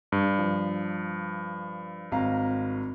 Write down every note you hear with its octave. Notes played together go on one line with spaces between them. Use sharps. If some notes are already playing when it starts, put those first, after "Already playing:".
G2
F3
G#1 F5 A#5